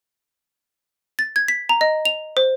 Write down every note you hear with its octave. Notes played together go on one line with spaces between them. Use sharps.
A6
G#6
B6
A#5
D#5
F7
C5